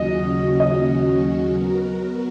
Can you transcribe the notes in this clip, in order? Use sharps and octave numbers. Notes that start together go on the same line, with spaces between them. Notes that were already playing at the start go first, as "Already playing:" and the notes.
Already playing: D#2 C#3 F#3 C#4 F#4 D#5
D#5
F#3 B3 F#4 A#4